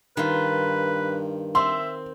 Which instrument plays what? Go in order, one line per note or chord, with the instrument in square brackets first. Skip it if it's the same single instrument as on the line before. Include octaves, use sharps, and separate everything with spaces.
[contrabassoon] G2 [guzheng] D#3 F4 [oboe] B4
[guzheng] C4 [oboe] E5 [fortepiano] C6